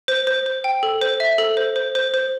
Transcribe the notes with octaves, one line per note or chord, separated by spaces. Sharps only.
C5
C5
C5
G5
A4
C5
E5
A4
C5
C5
C5
C5